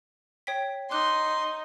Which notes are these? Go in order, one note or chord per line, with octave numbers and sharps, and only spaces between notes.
C#5 G5 B6
D#4 C6 D6 F#6